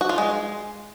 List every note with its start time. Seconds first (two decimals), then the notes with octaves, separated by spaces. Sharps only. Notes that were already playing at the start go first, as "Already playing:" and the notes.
0.01 F#4
0.09 F4
0.18 G#3